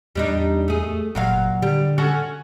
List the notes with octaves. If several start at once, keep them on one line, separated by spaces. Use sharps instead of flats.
E2 G3 D4 D#4
A3 G#4
F#1 A#2 F#3 F5
D3 G3
C#4 F#4 A4